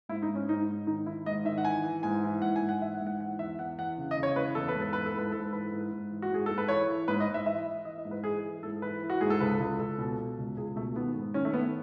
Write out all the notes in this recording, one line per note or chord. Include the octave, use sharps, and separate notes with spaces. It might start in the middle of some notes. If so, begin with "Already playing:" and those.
G#2 E4
D#4
G#2
C#4
G#2 D#4
G#2
D#3 D#4
D#3 E4
G#2 D#5
D#3 E5
F#5
E3 G#5
E3
G#2 G#5
E3
G#2 F#5
G#5
G#2
F#5
E3 E5
F#5
G#2
F#5
E3 F#5
E2 E5
E2 F#5
E2 F#5
C#3
D#5
C#3
C#5
E3 B4
E2 A4
B4
G#2
A4
E3 B4
A4
G#2 B4
G#2 A4
E3 B4
G#2
G#2
E3
F#4
G#2 G#4
G#2 A4
B4
E3 C#5
E3
G#2 B4
D#5
G#2
E5
E3 E5
E3
E3 D#5
D#5
G#2
B4
E3 G#4
E3
G#2 A4
E3 B4
E3
F#4
G#2 G#4
A4
C#2 B4
C#2
C#2 A4
B2
B2
C#2
C#2 G#4
B2 A3
D#3 B3
G#2
D#3 C#4
A3
D#3 B3